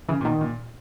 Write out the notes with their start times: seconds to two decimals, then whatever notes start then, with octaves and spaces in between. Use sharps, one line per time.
0.09 C#3 E3
0.21 A#2
0.25 B2 D#3
0.41 A#2